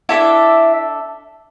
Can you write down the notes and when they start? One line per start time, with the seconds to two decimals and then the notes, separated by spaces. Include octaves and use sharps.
0.09 D4 E4 F#4 A4 E5